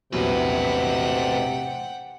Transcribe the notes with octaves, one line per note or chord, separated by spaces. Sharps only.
A#1 E2 A2 C3 F#3 B4 F#5 G5